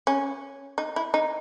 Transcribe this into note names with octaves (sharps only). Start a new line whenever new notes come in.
C#4
D#4
E4
D#4